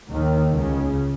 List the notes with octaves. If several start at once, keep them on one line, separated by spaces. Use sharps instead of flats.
D#2 D#3
C#2 C#3